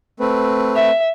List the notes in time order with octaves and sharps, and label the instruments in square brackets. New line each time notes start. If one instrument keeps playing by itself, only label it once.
[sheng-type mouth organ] A3 C4 B4
[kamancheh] E5